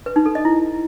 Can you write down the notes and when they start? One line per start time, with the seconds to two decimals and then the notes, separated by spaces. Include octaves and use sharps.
0.06 B4
0.16 D#4
0.26 A4
0.35 D#5
0.45 E4